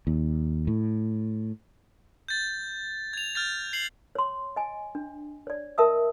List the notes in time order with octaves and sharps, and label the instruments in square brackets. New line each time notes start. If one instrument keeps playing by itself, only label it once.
[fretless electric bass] D#2
A2
[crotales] G6 A6
G#6 F7
F6 G6 A6
C7 F#7
[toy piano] C#5 C6
D#5 G#5
D4
C#5 D5
A#4 D#5 E5 A5 D#6 E6